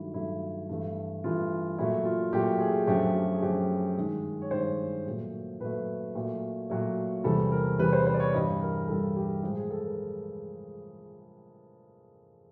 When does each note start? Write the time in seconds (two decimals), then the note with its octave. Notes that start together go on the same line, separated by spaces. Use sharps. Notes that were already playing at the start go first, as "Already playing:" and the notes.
Already playing: G2 D#3 F#3 A3 E4
0.14 G2 D#3 F#3 A3 E4
0.69 G2 E3 A3
1.24 G2 E3 A3 F4
1.78 A#2 F#3 A3 E4
2.05 F4
2.33 A#2 F#3 A3 G4
2.60 G#4
2.87 F#2 D3 F3 A3 G4
3.15 G4
3.35 G#4
3.42 F#2 D3 F3 A3 G4
3.97 G2 D#3 G#3
4.42 C#5
4.51 G2 D#3 G#3 C5
5.06 A#2 F#3 A3
5.60 A#2 F#3 A3 B4
6.15 A#2 F#3 A3
6.70 A#2 F#3 A3
7.24 E2 C3 E3 G3 A4
7.52 A#4
7.79 E2 C3 E3 G3 B4
7.93 C5
8.07 C5
8.14 D5
8.20 C#5
8.34 G2 E3 G3 D#5
8.61 A#4
8.88 G2 E3 G3 A4
9.16 G4
9.43 A2 F3 G#3 G4
9.57 G#4
9.70 A4
9.85 A#4